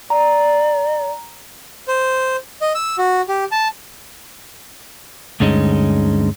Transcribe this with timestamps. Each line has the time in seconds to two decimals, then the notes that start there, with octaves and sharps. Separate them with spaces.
0.10 D5 A#5
1.88 C5
2.61 D#5
2.75 E6
2.98 F#4
3.29 G4
3.51 A5
5.40 D2 G2 D3 G#3 C#4 D#4